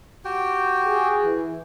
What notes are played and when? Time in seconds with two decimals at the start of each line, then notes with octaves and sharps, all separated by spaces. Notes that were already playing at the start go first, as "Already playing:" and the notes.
0.25 F#4 G4 G5
0.86 G#4
1.25 E3